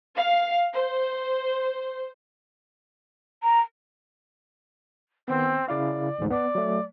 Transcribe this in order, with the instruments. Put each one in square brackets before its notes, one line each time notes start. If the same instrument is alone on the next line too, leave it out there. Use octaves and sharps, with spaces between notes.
[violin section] F5
C5
[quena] A#5
[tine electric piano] D#3 B3 [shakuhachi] C4
[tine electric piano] C#3 E4 F5 [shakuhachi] D5
[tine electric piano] A1 D2 G#2
[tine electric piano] B3 [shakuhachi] D5
[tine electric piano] F#3 A3